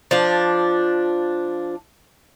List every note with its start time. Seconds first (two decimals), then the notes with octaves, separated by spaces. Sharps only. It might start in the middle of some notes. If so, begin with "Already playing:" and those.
0.11 F3 D4